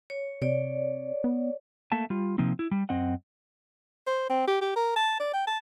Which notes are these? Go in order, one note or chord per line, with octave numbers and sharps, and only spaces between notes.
C#5
C3 C#5 D5
B3
A3 A#3 E5 A5
G3 F4
C3 F3 A#3 C4 D#4
E4
G3
F#2 C4 D#5 F#5
C5
C4
G4
G4
A#4
A5
D5
G5
A5